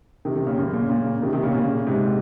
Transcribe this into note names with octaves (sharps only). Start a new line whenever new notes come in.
C3 D#3
C3 D#3
A#2 C#3
F#2
A#2 C#3
A#2 C#3
C3 D#3
C3 D#3
A#2 C#3
A#2 C#3
G#2 C3